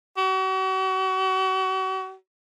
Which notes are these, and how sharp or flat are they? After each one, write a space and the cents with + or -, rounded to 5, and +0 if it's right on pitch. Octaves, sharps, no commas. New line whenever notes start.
F#4 +40